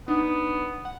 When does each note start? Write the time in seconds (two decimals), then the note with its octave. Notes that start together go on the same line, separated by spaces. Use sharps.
0.08 B3 D4 D#4
0.85 F#5